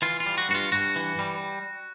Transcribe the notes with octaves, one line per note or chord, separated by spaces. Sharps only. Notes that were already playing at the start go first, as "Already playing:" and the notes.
E3 F4
F4
G3
F#4
G2 F#4
F4
G2 F#4
E3
G3